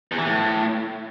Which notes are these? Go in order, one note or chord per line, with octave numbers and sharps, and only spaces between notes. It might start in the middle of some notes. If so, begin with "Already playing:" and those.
E2
E3
A2